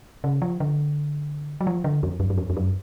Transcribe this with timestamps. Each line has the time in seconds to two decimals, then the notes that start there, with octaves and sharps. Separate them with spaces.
0.24 C#3
0.42 F3
0.60 D3
1.61 F#3
1.67 F3
1.84 D3
2.03 F2
2.20 F#2
2.30 F#2
2.38 F2
2.50 F2
2.57 F#2